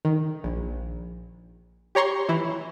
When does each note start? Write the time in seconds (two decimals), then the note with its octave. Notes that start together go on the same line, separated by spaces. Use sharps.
0.05 D#3
0.44 A#1
1.95 G4 C#5 A#5 C6 C#6
2.29 E3 E4